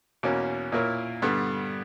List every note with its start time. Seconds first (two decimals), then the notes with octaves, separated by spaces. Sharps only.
0.23 E2 B2 A#3 C#4
0.72 A#2 A#3 E4 A#4 C#5
1.22 G2 D3 G3 B3